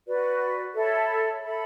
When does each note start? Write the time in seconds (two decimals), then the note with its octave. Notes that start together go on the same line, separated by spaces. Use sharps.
0.07 F#4 B4 D5
0.74 A4 C#5 E5 B5
1.43 A4 E5 B5